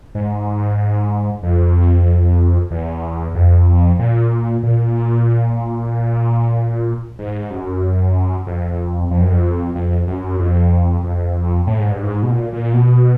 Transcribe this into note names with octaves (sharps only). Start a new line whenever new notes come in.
G#2
F2
E2
F2
A#2
A#2
G#2
F#2
F2
F2
F#2
F2
F2
F#2
F2
F2
A2
G#2
G2
G#2
B2
A#2
A#2
B2